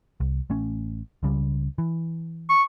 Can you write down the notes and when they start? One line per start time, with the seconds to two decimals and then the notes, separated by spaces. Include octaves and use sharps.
0.20 C2
0.50 A1 A3 C#4
1.23 C#2 C#3 G3
1.78 E3
2.49 C#6